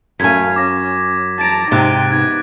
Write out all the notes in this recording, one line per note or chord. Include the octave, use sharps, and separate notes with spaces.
F#2 A3 F5 G#5 G#6 B6
C#4 D6 A#6
A5 A#5 A6 D7
G#2 C3 D#4 G5 F#6 A6
B3 D#4 F#6 G#6